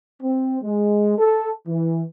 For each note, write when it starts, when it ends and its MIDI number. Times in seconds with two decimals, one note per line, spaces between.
0.21 0.57 60
0.62 1.14 56
1.17 1.51 69
1.68 2.03 52